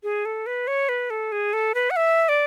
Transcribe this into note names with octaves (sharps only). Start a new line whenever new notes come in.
G#4
A4
B4
C#5
B4
A4
G#4
A4
B4
F#5
E5
D5